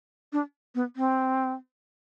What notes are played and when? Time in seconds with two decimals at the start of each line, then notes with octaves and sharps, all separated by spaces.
0.33 D4
0.75 B3
0.96 C4